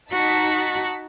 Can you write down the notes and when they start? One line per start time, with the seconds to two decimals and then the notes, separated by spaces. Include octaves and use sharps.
0.12 D#4 F#4 A5 B6